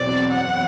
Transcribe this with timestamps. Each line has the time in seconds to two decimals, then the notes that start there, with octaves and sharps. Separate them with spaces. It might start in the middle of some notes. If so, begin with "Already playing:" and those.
Already playing: E2 B2 F#3 C4 D5
0.32 F#2 E3 B3 F#5